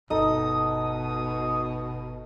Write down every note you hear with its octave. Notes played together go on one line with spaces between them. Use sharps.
G1 B2 D#4 E4 A4 D#6